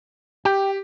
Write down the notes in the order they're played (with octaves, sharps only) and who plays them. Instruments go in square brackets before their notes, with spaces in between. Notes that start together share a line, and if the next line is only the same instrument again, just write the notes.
[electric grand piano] G4 [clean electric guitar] G5